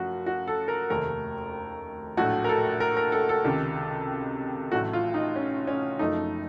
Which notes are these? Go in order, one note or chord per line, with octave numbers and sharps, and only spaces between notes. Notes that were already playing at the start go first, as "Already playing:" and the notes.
Already playing: F#2 F3 A3 F#4
F#4
A4
A#4
F1 D#2 D#3 A3 A#4
A#1 A2 F#3 A3 F#4
A#4
A4
A#4
A#4
A4
A4
C#2 C3 D#3
A1 A2 F#3 A3 F#4
F4
D#4
C#4
C#4
F#1 F#2 F3 A3 D#4